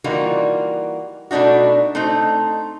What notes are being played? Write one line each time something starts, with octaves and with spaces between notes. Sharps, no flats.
E3 G3 A#3 D#4 F4 F#4
B2 A3 D4 D#4 F#4
A3 C4 D#4